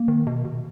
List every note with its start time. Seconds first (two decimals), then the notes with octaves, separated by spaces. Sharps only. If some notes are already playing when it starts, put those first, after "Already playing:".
Already playing: A#3
0.08 D#3
0.27 B2
0.45 B2